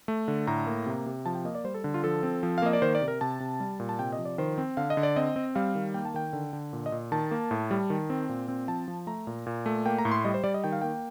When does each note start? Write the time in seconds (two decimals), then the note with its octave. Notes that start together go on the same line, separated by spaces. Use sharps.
0.08 A3
0.28 D3
0.47 A2 A#5
0.67 A#3
0.86 C3
1.06 C3
1.26 F3 A5
1.35 G5
1.45 A#3 D#5
1.55 D5
1.64 G3 C5
1.74 A4
1.84 D3
1.94 F4
2.04 F3 A4
2.23 C4
2.43 F3
2.58 F5
2.62 A#3 D#5
2.73 D5
2.82 D#3 C5
2.95 D5
3.01 C3
3.08 A#4
3.21 C3 A5
3.40 C3
3.60 G3
3.80 A#2
3.89 A5
3.99 C3 G5
4.13 D#5
4.19 F3
4.25 D5
4.38 D#3 C5
4.58 C4
4.77 D3 F5
4.90 D#5
4.97 D3
5.03 D5
5.16 C4 D#5
5.36 C4
5.55 G3 F5
5.75 D#3
5.94 A#3 G5
6.05 A5
6.14 D#3 G5
6.33 D3
6.53 D3
6.73 A#2
6.86 D#5
6.92 A#2
7.12 D#3 A5
7.31 A#3
7.51 A2
7.71 G3
7.90 D#3
8.10 C4
8.29 A#2
8.48 C4
8.68 F3 A5
8.88 F3
9.07 A3 A#5
9.27 A#2
9.47 A#2
9.66 A3
9.86 A#3 G5
9.98 A#5
10.05 A2
10.11 C6
10.25 G3 D#5
10.34 C5
10.44 G3 D5
10.54 D#5
10.64 D#3 G5
10.72 F5
10.82 A#3 G5